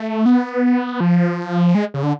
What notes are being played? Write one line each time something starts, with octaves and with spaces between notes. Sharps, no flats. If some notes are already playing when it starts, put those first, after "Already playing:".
Already playing: A3
B3
F3
G#3
C#3
D3